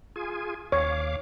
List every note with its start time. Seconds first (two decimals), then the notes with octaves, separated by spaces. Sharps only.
0.16 F4 G#4 G#5
0.72 D#2 C#5 F5 D6